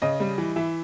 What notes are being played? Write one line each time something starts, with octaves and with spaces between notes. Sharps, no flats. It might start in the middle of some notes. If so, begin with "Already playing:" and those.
C#3 D#5
G3
E3
E3 E5